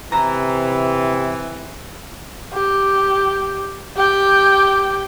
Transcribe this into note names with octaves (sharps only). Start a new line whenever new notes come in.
C3 E3 A#5
G4
G4 G5